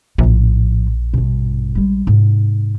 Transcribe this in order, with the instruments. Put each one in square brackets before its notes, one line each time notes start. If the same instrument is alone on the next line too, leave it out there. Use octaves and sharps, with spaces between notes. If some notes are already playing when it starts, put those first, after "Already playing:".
[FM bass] A#1 [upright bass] A2 F3
[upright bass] G2 B2
G3 G#3
G#2 C3